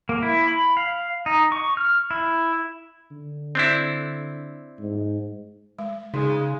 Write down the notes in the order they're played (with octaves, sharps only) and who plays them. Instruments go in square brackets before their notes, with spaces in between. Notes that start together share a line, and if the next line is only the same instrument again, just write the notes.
[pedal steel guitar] A#3
E4
B5
F5
D#4
C#6
F6
E4
[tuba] D3
[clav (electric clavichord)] C4 D4 E4
[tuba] G#2
[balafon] G#3
[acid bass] C#3 [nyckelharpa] G#3 [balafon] D#4